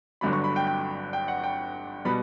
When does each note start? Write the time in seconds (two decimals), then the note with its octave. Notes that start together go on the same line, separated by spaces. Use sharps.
0.21 G1 G2 D3 F#3 B5
0.33 C#6
0.44 B5
0.56 G5
0.67 G5
1.13 G5
1.28 F#5
1.44 G5
2.05 B2 G3 B3 B5